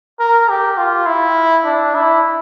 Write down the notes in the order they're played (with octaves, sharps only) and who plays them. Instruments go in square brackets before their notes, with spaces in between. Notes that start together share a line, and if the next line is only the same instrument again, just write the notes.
[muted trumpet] A#4
G4
F4
E4
D4
E4